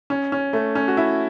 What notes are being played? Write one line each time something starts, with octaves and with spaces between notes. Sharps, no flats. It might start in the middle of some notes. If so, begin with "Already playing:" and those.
C#4
C#4
A3
C#4
F#4
E4